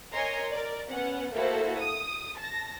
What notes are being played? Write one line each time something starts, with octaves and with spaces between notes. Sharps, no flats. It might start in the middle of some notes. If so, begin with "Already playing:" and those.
A#4 C#5 D#5 G#5 A#5 C6
A#4 D5
B3 C#4 F#5
A3 A#3 E4 F#4 A4 C5
D#6
A5 A#6